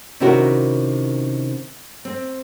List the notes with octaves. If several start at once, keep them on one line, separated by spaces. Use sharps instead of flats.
C3 D#3 C#4 E4 F#4 A#4
C4